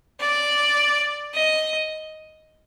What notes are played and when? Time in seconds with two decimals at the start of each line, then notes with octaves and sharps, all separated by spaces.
0.20 D5
1.34 D#5